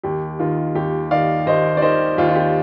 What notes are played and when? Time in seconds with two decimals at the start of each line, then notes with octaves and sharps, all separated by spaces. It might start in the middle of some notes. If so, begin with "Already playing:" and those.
0.03 D#2 G4
0.39 D#3 F4
0.75 D#2 G4
1.11 D#3 D5 F5
1.46 D#2 C5 D#5
1.77 D5
1.82 D#3 C5 D#5
2.18 D#2 F4
2.29 F4
2.35 G4